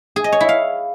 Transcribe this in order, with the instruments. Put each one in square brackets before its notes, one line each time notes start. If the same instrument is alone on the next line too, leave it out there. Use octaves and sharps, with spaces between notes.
[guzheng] G#4
D#5
C#5
E4
F5